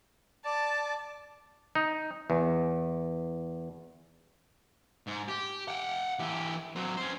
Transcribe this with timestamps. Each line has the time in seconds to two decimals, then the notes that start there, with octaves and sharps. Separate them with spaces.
0.45 D5 A5
1.75 D#4
2.30 E2
5.07 G#2
5.28 G4
5.68 F#5 G5
6.19 E3 G4
6.76 F#3 C4
6.97 C#4 C5